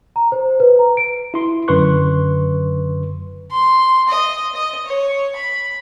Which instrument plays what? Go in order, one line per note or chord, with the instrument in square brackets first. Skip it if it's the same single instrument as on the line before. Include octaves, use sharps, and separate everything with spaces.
[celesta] A#5
C5
B4
A#5
D7
[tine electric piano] E4 C6
F#2 D3 B4 C6 C#6 F#6
[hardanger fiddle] C6
D#5
D#5
C#5
B5